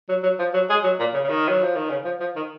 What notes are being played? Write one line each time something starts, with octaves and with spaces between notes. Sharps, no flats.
F#3
F#3
F3
F#3
G#3
F#3
A#2
C#3
C#3
D#3
F#3
F3
D#3
C#3
F3
F3
D#3